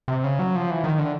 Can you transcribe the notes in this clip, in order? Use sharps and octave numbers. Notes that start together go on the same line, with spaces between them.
C3
C#3
F#3
F3
E3
D#3
D3